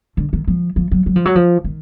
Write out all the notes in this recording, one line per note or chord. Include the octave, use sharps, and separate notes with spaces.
D3
D#3
F3
F3
F#3
F#3
F3
F#3
F3
D#3